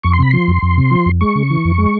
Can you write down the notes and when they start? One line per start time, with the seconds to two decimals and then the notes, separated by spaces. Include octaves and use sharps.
0.03 F2 C#6
0.13 C6
0.19 C3 B5
0.31 F3 C6
0.48 F2
0.62 F2
0.77 C3
0.91 F3
1.06 F2
1.21 G#3 C#6
1.35 C#3
1.50 E3
1.65 F2
1.78 G#3